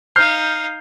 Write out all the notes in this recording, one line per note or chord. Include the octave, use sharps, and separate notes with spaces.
D#4 F5 F6 G6 C7